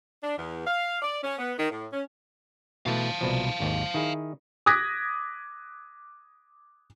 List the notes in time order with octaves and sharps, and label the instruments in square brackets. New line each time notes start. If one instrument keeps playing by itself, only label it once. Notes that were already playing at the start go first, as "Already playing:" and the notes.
[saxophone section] D4
E2
F5
D5
C#4
B3
D#3
A2
C#4
[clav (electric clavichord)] B2 E3 A3 [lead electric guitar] F5 A5
[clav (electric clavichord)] C2 B2 F3
G#1 D#2
D#3 E4 G#4
[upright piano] D6 D#6 F#6 G#6 A#6 B6